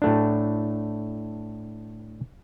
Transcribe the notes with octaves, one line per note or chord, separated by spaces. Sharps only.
A2 A3 D4